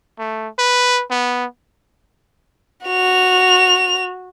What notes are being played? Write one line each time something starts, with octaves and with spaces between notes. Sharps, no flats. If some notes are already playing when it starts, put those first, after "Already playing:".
A3
B4
B3
F#4 F7